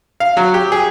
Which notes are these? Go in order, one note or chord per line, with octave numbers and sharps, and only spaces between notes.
F5
F#3
G4
G#4